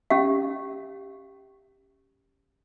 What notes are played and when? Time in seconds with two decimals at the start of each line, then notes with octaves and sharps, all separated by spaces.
0.10 C#4 G4 F5